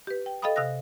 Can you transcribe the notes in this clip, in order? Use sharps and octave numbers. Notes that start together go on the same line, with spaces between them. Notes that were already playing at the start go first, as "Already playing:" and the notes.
G4 B4
G5
A4 D#5 F5 G5 B5 D#6
C3 F5 D#6 F#6 A#6